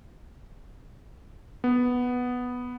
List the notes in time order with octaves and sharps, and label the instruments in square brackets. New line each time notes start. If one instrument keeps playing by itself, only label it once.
[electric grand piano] B3